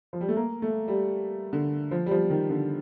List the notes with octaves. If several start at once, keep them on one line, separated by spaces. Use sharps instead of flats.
F3
G3
A3
A#3
A3
G3
D3
F3
G3
F3
D#3
D3